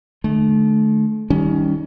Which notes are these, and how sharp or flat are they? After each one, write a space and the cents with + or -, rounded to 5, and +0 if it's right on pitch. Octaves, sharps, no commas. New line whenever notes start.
D3 +40 A3 -30
D#3 +20 G3 +0 C#4 +25